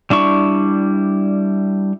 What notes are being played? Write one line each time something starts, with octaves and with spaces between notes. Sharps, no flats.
G3 D4 E4 C#6